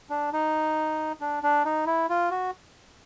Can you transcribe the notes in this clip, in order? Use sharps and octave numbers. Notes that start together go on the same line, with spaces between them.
D4
D#4
D4
D4
D#4
E4
F4
F#4